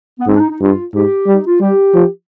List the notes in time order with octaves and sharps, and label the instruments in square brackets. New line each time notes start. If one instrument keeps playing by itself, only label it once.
[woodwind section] B3
[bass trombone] G#2 [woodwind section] C4
[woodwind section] D4
D#4
D#4
[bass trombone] G2 [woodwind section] F4
[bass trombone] G#2 [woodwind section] G4
[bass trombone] G3
[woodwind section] D#4
F4
[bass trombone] G3 [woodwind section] G4
[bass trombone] F3